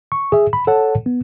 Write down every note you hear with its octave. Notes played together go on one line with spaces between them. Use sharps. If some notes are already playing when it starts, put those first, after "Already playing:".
C#6
G#4 E5
B5
A4 C#5 F#5 A5
B3